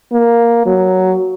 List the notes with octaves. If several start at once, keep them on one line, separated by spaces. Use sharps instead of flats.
A#3
F#3